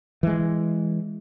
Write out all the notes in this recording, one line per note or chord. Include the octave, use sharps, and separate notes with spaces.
E3 G#3